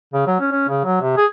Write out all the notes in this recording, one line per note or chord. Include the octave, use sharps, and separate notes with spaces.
C#3
F#3
C#4
C#4
C#3
F#3
C3
G#4